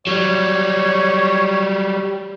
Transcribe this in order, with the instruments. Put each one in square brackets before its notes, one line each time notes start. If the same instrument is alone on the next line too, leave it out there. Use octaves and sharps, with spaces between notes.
[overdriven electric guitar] F#3 G3 [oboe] C#5